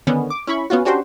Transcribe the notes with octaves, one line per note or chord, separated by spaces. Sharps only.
D3 D#3 B3 C#4
D6
C#4 E4 B5 C#6
B3 C#4 F4 F#4
C#4 D4 F#4 G4 C5